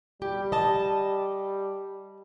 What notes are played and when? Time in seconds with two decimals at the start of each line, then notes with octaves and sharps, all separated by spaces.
0.22 G3 G4
0.52 D#5 A5